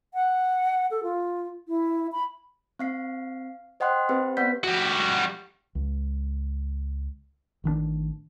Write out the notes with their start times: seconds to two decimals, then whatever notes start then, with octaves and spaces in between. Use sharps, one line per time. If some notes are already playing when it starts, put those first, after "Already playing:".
0.14 F#5
0.91 A4
1.03 F4
1.68 E4
2.12 B5
2.79 C4 F5 C7
3.80 C5 D#5 F#5 G5 C6 F#6
4.09 C4 G4 B4 C5
4.37 B3 B4 D5 F#5 G6 B6
4.64 G3 F#4
5.75 C#2
7.64 A1 D#3 G3 D4